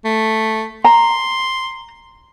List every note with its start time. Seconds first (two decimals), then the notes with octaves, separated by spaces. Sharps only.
0.05 A3
0.84 A#5 C6